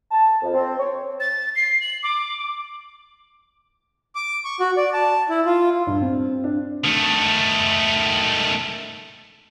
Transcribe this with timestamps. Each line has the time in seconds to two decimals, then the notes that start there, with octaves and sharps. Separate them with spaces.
0.12 A5
0.42 F2
0.54 C4
0.79 C#5
1.20 A6
1.55 C7
1.81 F#7
2.03 D6
4.15 D6
4.44 C#6
4.60 F#4
4.77 D5
4.93 A5
5.29 E4
5.46 F4
5.87 G2
6.01 C4
6.44 D4
6.85 D#3 A3